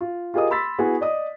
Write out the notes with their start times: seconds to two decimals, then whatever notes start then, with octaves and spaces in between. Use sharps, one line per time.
0.01 F4
0.34 F4 G4 G#4 A#4 D#5 D#6
0.51 B5 C6 E6 A6 B6
0.79 B3 E4 F#4 G#4
1.01 D5 D#5 D#6